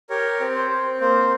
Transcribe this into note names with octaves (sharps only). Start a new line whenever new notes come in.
G4 A#4 C#5
C4
C5
C4
A#3 C5